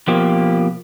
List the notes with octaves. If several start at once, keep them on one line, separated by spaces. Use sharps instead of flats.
B2 F3 A#3 G4